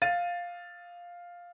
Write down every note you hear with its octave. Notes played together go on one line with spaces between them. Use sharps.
F5 A6 D#7